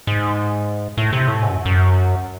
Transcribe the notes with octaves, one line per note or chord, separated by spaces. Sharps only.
G#2
A2
C3
A2
G#2
F#2
F#2